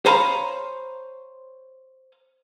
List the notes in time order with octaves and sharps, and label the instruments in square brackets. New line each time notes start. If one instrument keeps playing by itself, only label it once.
[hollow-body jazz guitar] C5 C#5 F5 G#5 A#5 B5